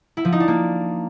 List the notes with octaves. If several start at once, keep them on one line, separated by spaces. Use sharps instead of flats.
E4
F3
D#4
D4
A#3